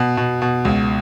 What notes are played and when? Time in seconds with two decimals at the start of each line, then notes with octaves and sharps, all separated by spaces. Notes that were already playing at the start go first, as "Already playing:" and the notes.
Already playing: B2
0.17 B2
0.42 B2
0.65 C#2